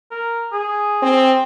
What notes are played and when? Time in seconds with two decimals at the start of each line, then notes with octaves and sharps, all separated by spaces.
0.11 A#4
0.53 G#4
1.02 C4